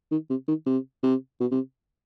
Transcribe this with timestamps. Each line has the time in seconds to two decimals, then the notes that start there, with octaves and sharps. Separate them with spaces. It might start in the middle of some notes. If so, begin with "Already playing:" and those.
0.11 D#3
0.30 C3
0.48 D#3
0.66 C3
1.03 C3
1.40 B2
1.51 C3